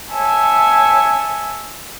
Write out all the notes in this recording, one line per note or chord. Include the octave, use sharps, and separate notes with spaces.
C#5 E5 G#5 A5